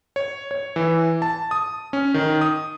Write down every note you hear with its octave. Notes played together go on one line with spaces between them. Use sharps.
C#5
C#5
E3
A5
D#6
C#4
D#3
D#6